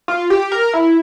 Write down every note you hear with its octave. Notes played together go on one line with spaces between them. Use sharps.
F4
G4
A#4
E4